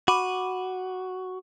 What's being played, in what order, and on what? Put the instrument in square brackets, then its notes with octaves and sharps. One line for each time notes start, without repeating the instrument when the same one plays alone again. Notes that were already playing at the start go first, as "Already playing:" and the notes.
[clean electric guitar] F#4 [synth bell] B5 D6 D#7